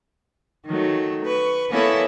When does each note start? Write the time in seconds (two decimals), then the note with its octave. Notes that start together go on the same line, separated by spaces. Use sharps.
0.66 D#3 F#3 A3
1.24 B4 C#6
1.70 A#3 B3 C#4 E4 A4 C#5